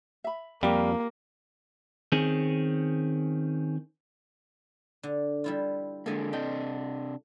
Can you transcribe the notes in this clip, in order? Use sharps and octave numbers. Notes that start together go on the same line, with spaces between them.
E5 B5
F2 G3 A#3 F4 G4 F5
D#3 C4 C#4 G#4
D3
G3 E4 F4
D3 G#3 A#3 A4 G#5
C3 D4 D#5 G5